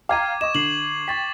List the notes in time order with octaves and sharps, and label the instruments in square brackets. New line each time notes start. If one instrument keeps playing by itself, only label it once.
[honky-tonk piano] F5 G5 A#5 [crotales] D6 G#6 D#7
[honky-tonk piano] D#5 [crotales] C#6 E7
[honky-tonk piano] D3 [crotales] C7 F#7
[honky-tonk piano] G5 [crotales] C#6 A6 B6